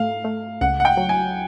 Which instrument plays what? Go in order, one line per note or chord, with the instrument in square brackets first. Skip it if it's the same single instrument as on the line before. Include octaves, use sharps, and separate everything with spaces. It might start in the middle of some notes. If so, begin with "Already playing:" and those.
Already playing: [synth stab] G#2 A3 [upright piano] F5
[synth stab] A3
[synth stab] C#2 [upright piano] F#5
[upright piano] F#5
G5
[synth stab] F#3
[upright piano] G#5